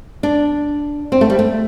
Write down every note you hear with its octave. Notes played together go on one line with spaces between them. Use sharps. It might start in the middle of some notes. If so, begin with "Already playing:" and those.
D4
C4
A3
G3
A3